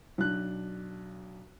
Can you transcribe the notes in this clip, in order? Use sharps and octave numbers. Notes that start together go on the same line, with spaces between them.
B1 D4 F#6